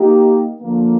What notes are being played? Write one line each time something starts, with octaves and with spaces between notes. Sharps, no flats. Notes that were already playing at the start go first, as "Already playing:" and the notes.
Already playing: A#3 D#4 G4
D3 F3 A#3